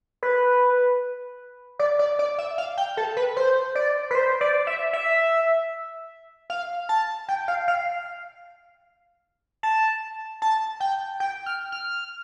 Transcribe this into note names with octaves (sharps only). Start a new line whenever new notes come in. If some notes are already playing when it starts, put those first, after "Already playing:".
B4
D5
D5
D5
E5
F5
G5
A4
B4
C5
D5
B4
C5
D5
E5
E5
F5
A5
G5
F5
F5
A5
A5
G5
G5
F6
F6